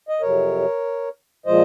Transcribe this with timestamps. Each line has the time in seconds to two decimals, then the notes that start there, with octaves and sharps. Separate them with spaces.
0.09 D#5
0.21 F2 C3 F#3 A#4 C#5
1.46 A#2 F3 G#3 C5 D#5